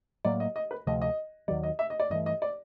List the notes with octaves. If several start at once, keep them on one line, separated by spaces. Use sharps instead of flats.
A2 F#3 A#3 D5
D#5
D#5
B4
D2 C3 F3 A3 D#5
D#5
D#2 D#3 F#3 D5
D#5
E5
D#5
D5
G2 E3 A3 D#5
D#5
D5